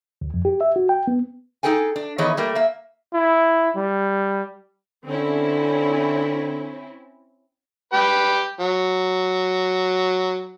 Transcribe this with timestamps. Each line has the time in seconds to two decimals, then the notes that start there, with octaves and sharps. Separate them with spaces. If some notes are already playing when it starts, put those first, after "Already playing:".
0.21 D2
0.34 F2
0.45 G4
0.61 E5
0.76 F#4
0.89 G5
1.07 B3
1.63 D#4 G#4 A4 G5 G#5
1.96 D4
2.18 D#3 E3 B3 G#4 C#5 D#5
2.37 G3 A3 A#3
2.55 A#3 E5
3.13 E4
3.76 G3
5.06 D3 C4 C#4 E4
7.93 G4 B4 G5
8.60 F#3